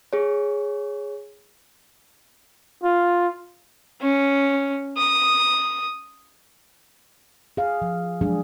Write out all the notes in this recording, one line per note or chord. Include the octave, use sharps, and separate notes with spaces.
G#4 C#5
F4
C#4
D#6
G#4 F5
F3
F3 F#3 G#3 D4 G#4